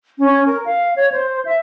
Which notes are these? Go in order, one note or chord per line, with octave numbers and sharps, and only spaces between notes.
C#4
A#4
F5
C#5
C5
E5